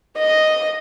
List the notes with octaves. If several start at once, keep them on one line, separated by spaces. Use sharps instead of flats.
D#5